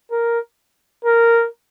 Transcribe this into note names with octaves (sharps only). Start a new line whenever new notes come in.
A#4
A#4